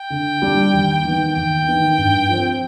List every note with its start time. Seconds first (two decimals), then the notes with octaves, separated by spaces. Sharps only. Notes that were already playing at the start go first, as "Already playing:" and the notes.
Already playing: G5
0.10 D3
0.42 G3 D4
0.73 D#2
1.05 D#3 B3
1.35 D#2 G5
1.67 D#3 B3
1.98 G2
2.29 F3 C4